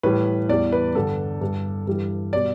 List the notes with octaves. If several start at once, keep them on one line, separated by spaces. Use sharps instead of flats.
A2 E3 G3 B4
E2 E3 G3 D5
B4
G2 D3 G3 A4
G2 G3
G2 E3 G3
B2 G3 D5